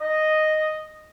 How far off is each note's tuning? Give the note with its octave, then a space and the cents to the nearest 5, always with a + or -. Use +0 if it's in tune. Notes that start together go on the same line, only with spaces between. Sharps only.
D#5 -5